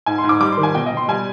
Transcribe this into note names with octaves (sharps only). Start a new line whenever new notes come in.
G#2 G#5
C6
G#2
D6
G3 D6
C6
D#3
G#5
B2 G5
D#5
B2 C6
G3 G#5